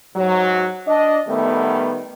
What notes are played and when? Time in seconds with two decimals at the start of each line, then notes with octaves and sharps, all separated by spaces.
0.16 G#2 F#3
0.87 D4 D#5
1.28 D#3 G3 A3 B3